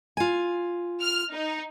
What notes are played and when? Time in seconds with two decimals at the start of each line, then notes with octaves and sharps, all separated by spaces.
0.17 F4 G#5
1.01 F6
1.33 D#4